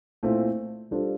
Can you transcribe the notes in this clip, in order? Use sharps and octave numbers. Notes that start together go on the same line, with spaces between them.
A#2 A3 C4 E4
G3 D4 F4 A4 C5